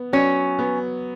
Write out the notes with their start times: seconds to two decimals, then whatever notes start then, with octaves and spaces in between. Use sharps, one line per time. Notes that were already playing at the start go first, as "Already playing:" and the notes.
Already playing: B3
0.13 F#3 C#4
0.59 B3